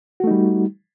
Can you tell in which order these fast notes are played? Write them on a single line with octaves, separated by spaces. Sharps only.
F#4 A3 D#4 G3